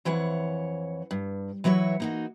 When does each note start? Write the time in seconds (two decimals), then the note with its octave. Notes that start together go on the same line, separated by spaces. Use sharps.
0.05 F2 E3 E4 C#5 F#5
1.11 G2
1.64 E3 F#3 E4 B4 C#5
2.00 A#3 D#4 F#4